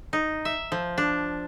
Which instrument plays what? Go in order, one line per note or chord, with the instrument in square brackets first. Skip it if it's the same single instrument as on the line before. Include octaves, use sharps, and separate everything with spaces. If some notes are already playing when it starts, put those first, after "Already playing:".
[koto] D#4
E5
F3
D4